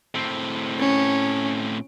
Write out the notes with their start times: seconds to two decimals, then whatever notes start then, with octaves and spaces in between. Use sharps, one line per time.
0.15 A2 C4
0.80 C#4